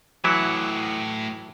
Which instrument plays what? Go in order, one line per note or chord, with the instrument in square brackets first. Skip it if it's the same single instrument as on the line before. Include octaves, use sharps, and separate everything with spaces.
[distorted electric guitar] A2 F#5 [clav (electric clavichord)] E3 F#3 E4